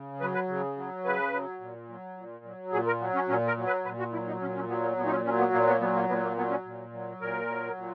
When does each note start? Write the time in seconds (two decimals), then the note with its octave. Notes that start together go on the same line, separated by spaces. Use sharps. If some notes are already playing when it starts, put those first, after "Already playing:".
Already playing: C#3
0.21 F#3 B4
0.34 B4
0.49 C#3
0.77 F#3
1.05 C#3 B4
1.33 F#3
1.61 A#2
1.89 F#3
2.17 A#2
2.45 F#3
2.73 A#2 G#4
2.87 A#4
3.01 F#3 B3
3.15 C#4
3.29 A#2 C#4
3.47 A#4
3.57 F#3
3.67 B4
3.85 A#2 B4
3.99 F#4
4.13 F#3 E4
4.27 D#4
4.41 A#2 C#4
4.55 C#4
4.69 F#3 B3
4.83 A#3
4.97 A#2 B3
5.06 D#4
5.11 C#4
5.25 F#3 C#4
5.38 B3
5.53 A#2 A#3
5.67 B3
5.80 F#3 B3
5.95 A#3
6.09 A#2 B3
6.23 A#3
6.37 F#3 B3
6.51 C#4
6.65 A#2
6.93 F#3
7.21 A#2 A#4
7.49 F#3
7.77 A#2